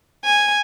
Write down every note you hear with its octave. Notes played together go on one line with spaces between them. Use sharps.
G#5